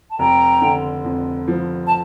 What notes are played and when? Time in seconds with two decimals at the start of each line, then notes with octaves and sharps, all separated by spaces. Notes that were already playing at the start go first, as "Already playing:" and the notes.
0.11 A5
0.18 F1 G5 A#5
0.62 D3
1.05 F2
1.48 F3
1.87 A5